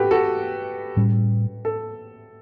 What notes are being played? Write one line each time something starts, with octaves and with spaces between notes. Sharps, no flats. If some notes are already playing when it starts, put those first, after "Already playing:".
Already playing: F#4 G4 A4 B4
F#4 A4
A2 G3 C#4
A4